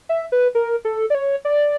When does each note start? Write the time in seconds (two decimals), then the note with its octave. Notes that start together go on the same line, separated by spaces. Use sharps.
0.09 E5
0.32 B4
0.55 A#4
0.85 A4
1.10 D5
1.15 C#5
1.45 D5